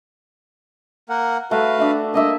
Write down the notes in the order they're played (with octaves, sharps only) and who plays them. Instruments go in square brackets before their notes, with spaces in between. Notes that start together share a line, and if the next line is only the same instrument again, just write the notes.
[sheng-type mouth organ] A#3 A#4 F#5
[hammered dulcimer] A3 [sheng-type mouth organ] F#4 B4 F5
[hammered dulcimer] D4 E5 F#5
[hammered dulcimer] A#3 D4 E5 [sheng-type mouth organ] D#5